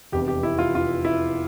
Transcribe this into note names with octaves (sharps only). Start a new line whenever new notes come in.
F1 E2 C3 G4
G4
E4
F4
F4
E4